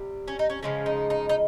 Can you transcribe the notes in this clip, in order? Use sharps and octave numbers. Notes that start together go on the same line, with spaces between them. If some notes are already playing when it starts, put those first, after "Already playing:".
Already playing: C3 G3
C#4
D#4
C#4
C#3 F3 G#3 C#4
D#4
D#4
D#4